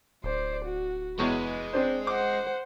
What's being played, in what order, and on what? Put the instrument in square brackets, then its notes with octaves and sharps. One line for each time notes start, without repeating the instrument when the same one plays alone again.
[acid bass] D1 [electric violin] C5 D5
[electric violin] F#4
[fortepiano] E2 C#5 C#6 [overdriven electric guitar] G#3 [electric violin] B4
[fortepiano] C4 D4 C5
[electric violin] C5 F#5 [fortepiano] D6